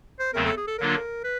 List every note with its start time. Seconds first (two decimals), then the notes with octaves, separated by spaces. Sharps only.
0.19 C5
0.34 E2 C#3 F#3 A3 C4 A#4
0.45 A4
0.57 G#4
0.68 A4
0.79 D3 F#3 A#3 D4 F4 A#4
1.24 B4